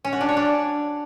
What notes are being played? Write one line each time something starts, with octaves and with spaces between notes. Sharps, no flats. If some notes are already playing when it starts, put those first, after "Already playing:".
C#4
F#4
D4
C#5
D4